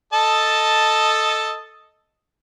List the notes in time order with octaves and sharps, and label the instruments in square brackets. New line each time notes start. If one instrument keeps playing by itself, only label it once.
[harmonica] A4 D#5 A5